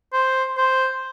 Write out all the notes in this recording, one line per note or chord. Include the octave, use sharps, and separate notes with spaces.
C5
C5